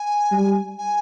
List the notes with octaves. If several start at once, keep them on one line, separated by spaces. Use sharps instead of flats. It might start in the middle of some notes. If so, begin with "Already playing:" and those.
Already playing: G#5
G3
G#5